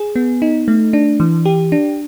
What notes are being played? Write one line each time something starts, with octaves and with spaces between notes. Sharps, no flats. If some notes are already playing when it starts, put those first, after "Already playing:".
Already playing: G#4
B3
D#4
A3
D4
E3
G4
D4